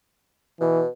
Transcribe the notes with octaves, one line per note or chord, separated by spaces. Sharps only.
B2 E3